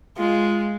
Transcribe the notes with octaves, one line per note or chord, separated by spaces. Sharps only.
G#3 F4